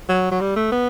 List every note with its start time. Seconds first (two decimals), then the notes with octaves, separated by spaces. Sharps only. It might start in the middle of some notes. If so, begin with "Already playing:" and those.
0.09 F#3
0.31 F#3
0.41 G3
0.56 A3
0.72 B3